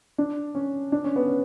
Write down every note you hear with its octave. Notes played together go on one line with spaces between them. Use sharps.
D4
C#4
D4
C#4
B3
C#4